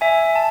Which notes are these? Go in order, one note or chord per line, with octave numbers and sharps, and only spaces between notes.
E5 G#5
A5